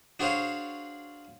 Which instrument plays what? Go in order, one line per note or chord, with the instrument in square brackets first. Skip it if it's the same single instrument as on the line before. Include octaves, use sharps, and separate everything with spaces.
[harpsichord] D4 F#4 G#4 C5 C#5 F5